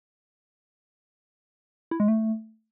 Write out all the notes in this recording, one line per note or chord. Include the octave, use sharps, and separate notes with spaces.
E4
G#3
A3